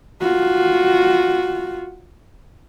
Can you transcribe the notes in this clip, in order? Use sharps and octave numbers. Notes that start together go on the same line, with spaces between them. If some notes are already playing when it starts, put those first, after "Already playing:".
F4 F#4